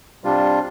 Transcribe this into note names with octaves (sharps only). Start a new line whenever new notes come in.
C3 G3 D4 F4